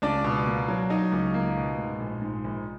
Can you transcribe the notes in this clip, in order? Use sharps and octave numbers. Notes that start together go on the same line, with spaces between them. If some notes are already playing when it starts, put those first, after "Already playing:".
C#2 D4 D5
B2
A#3
F#3
F#3 D#4 D#5
C#2
A#3
B2
G#2
A#1
G#2
A#1